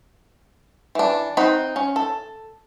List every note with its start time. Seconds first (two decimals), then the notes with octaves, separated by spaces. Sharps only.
0.95 E3 D4
1.37 C4 D#4 F#5 B5
1.76 C#4
1.96 A4